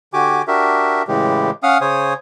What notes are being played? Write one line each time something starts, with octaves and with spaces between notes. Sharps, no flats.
D3 F#4 G4 G#5 D6
D4 F#4 G4 A#4 E5
A2 C#3 E3 G#3 G4
C#4 F5 F#5 D#6 F6
C#3 C5 C#5 G#5 D#6